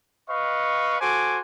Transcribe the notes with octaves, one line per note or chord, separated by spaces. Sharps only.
B4 D#5 F5 C#6
F#4 A4 C5 G#5 D6